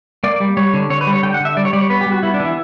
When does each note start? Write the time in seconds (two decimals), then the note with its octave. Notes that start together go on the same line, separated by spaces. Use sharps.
0.24 A#3 D5
0.40 G3
0.57 G3 C#5
0.74 D3
0.90 D3 C#5
1.01 B4
1.07 G3
1.13 C#5
1.23 D3 G5
1.34 F#5
1.40 D3 E5
1.56 G3 D5
1.65 C#5
1.73 G3 D5
1.81 C#5
1.90 B3 B4
2.01 G4
2.06 G3
2.12 F#4
2.23 B3 E4
2.34 D4
2.40 E3
2.45 E4